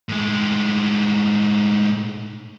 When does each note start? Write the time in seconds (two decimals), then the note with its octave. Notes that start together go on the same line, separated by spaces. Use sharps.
0.09 A2 G#3